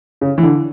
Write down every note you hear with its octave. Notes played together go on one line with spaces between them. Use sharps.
C#3
E3
D3